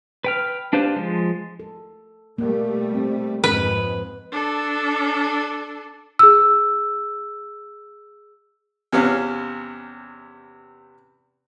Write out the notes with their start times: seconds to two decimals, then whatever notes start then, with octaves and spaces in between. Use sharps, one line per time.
0.24 B4 G5 F6
0.73 D4 G4 B4 C5 F5
0.96 F3 G#3
1.60 A4
2.38 B2 G3 A3 A#3
2.95 C4
3.44 F2 G#2 G#3 B4
4.32 D4 A4
6.19 G#4 E6
8.92 E2 C3 B3 C#4 F5